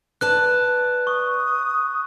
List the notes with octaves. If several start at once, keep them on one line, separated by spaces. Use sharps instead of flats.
B4 D5 A5 F#6
C#6 D#6